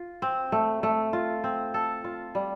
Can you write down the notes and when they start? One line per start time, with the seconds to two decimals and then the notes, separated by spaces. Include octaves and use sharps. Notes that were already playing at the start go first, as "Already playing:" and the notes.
Already playing: F4
0.22 C4
0.52 A3
0.83 A3
1.13 F4
1.44 C4
1.74 A4
2.04 F4
2.35 G3